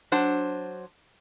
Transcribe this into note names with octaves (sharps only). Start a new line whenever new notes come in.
F#3 D4 C5 F#5